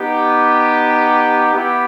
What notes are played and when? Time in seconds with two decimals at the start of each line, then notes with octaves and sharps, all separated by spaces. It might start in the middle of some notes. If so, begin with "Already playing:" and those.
Already playing: B3 D#4 G4
1.53 B3 E4 G4